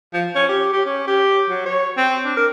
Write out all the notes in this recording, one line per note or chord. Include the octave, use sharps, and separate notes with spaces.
F3
C#4
G4
G4
C#4
G4
F#3
C#5
C4
D4
A#4